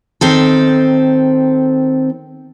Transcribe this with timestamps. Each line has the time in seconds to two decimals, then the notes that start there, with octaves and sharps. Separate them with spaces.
0.21 D#3 C4 A4